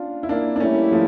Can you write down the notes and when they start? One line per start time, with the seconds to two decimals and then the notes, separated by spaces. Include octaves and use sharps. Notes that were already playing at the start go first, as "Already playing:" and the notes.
Already playing: C#4 D4 F4
0.23 E4
0.29 A#3 D4
0.56 D4
0.60 A2 G3 A3 A#3 C#4 E4
0.91 F3 A3